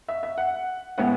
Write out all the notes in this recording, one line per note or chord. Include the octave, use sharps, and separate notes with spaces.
E5
E5
F#5
A2 G#3 B3 F#5